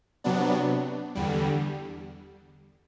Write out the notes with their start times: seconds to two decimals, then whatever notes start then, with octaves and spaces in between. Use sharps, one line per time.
0.24 C3 F#3 B3 D4
1.15 E2 D3 G3